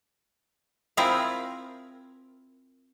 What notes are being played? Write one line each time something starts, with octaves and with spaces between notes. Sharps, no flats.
C4 E4 F4 G#4 A#4